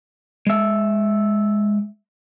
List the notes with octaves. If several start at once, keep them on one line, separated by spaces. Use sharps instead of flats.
G#3 E5